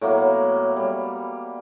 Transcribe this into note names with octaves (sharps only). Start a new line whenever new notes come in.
A2 F#3 A#3 B3
G3